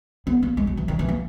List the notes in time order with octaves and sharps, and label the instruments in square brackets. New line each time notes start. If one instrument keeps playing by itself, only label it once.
[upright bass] B3
A#3
G#3
F#3
E3
D#3
E3
A#3